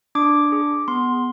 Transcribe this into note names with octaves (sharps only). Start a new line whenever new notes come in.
D4 D6
G#4
B3 C6